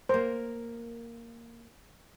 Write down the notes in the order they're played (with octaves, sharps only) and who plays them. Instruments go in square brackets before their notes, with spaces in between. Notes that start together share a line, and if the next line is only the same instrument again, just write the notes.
[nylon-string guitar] A#3 A#4 [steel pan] C5